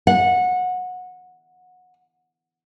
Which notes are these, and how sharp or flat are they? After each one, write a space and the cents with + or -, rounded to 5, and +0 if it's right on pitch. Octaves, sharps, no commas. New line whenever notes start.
F#5 -20